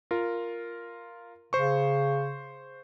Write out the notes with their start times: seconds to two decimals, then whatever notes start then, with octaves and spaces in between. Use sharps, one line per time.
0.11 F4 A#4
1.53 C#3 C5 C#6